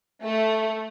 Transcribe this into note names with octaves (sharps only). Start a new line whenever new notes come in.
A3